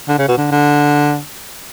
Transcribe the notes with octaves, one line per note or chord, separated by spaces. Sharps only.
D3
C#3
B2
D3
D3